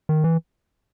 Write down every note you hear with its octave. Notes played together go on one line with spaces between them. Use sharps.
D#3
E3